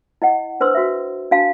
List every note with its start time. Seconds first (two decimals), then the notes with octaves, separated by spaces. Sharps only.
0.22 E4 D#5 F#5
0.60 D4 B4 C5 C6 E6
0.75 F#4 E5
1.31 D4 F#4 F5 A5